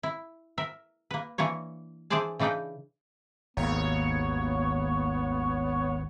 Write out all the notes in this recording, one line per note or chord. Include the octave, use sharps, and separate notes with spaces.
E4
A#4 E5
A#3 B4
E3 A#3 D4 C#5
E3 D4 G#4 C5 D5 A5
C#3 E3 D4 D#4 B4 G5
G#1 D#2 A#3 B3 C#5 F5